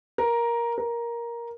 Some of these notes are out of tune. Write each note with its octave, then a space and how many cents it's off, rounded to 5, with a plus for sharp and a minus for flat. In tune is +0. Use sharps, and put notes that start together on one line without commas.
A#4 +10
A#4 +10